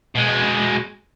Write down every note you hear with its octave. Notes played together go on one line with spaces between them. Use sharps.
B2 G#3